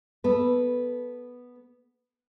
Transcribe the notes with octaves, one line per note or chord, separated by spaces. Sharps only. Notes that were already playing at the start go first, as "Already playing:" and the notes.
B3 A4 B4